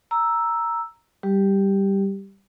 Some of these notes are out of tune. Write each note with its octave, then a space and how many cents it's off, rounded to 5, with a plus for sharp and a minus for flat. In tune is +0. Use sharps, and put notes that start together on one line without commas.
A#5 +0 E6 +0
G3 +0 G4 +0